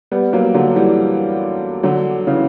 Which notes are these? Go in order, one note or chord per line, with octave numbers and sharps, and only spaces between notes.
G3 B3
F#3 A#3
D3 F#3
E3 G3
D3 F#3
C#3 E3